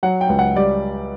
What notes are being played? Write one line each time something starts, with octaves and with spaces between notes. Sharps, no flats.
F#3 F#5
G5
C#2
F#5
G3 D5